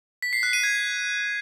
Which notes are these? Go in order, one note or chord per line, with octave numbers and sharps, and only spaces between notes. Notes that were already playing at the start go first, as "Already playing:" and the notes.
B6
C7
F#6
D#7
G#6